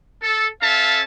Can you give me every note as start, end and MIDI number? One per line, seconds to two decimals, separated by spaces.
0.23 0.48 69
0.62 1.00 61
0.62 1.00 69
0.62 1.00 76
0.62 1.00 77
0.62 1.00 81